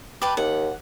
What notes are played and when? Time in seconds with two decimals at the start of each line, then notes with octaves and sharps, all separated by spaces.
0.22 G4 B4 A5
0.37 D#2 F#5